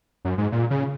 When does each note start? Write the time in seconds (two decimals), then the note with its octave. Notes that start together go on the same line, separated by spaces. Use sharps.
0.25 F#2
0.38 G#2
0.52 A#2
0.70 C#3